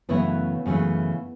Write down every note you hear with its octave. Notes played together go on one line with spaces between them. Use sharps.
F#2 C#3 E3 A3 B3 E4
F#2 C#3 E3 A3